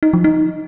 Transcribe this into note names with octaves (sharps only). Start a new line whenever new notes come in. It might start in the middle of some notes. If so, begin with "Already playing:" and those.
D#4
F3
D#4